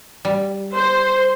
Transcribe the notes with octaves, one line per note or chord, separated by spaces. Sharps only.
G3
C5